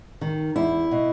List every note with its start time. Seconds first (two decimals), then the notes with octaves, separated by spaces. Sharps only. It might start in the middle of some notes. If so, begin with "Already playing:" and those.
0.21 D#3
0.56 E2 E4
0.91 B2